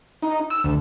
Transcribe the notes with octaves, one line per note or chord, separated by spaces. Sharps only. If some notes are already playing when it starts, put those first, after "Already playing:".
D#4
E6
D2